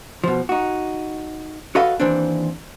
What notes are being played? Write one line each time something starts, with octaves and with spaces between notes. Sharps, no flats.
B2 F3
D#4 F#4
F#4 A4 B4 D#5 F5
D#2 E3 C4 D4